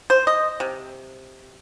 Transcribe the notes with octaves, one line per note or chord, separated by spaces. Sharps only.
C5
D#5
C3